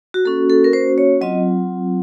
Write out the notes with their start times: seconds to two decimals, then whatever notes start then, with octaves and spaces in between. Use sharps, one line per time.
0.14 F#4
0.25 A#3 C#4 F#4 A4
0.50 A4
0.64 A#4
0.73 C5
0.98 C#5
1.21 F#3 C4 F4 D#5